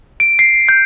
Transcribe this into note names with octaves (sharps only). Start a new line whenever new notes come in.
D7
C7
G6